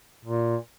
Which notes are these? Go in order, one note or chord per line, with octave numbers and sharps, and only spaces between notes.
A#2